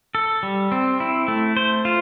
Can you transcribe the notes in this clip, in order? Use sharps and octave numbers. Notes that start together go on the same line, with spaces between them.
A4
G3
C4
E4
A3
C5
F4